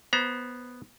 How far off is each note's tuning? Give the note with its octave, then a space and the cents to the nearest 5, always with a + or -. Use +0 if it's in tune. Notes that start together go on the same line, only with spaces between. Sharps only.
B3 -5 C5 +0 A#5 +30